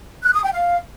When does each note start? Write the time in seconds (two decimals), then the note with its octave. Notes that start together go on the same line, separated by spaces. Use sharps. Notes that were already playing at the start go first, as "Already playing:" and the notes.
0.23 F#6
0.33 D#6
0.43 G5
0.53 F5